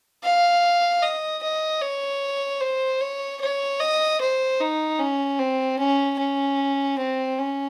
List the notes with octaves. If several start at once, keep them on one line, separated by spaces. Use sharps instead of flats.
F5
D#5
D#5
C#5
C5
C#5
C#5
D#5
C5
D#4
C#4
C4
C#4
C#4
C4
C#4